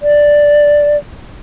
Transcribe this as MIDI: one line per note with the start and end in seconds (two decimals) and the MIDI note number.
0.01 0.97 74